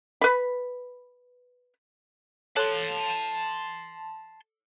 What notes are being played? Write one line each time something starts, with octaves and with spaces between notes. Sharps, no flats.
B4 B5
A4 C#5 A5 C6 F#6